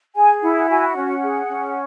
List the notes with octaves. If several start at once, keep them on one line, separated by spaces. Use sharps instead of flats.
G#4 G#5
E4 F#5
F#5
F#4 G#5
F#5
C#4
F#5
G#4
C#4